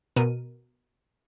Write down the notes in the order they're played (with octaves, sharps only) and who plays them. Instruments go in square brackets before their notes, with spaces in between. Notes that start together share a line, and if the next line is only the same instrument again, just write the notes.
[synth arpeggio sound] B2 A#4 D#7